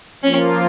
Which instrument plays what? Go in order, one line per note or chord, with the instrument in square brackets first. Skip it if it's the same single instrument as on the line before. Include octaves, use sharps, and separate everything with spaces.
[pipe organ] F3 A#3 F4 [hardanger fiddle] C#4